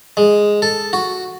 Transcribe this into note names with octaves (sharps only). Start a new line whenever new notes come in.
G#3
A4
F#4